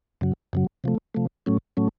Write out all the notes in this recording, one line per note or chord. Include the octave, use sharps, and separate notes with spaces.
F#2 C#3 F#3
F#2 C#3 F#3
C3 F3 A3
C3 F3 A3
A2 F#3 A3 C#4
A2 F#3 A3 C#4